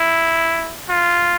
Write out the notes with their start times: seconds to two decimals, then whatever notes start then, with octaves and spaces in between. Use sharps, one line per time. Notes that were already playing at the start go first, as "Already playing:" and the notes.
Already playing: E4
0.89 F4